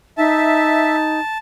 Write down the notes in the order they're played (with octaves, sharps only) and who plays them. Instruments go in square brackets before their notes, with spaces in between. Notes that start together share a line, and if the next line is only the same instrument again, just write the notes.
[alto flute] D#4 [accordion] E5 [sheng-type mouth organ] A5